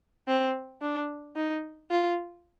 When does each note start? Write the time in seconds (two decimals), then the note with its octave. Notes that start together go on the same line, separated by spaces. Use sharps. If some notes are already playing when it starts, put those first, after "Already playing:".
0.27 C4
0.81 D4
1.36 D#4
1.91 F4